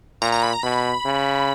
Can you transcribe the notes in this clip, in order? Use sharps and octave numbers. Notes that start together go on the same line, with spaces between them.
A#2 A#5
A#5
B5
A#5
B2 B5
C#3